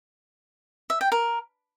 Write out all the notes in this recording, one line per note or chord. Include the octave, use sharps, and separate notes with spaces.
E5
G5
A#4